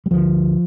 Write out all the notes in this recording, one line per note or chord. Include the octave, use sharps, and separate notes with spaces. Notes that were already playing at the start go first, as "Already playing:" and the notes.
G3
D2 D3 F3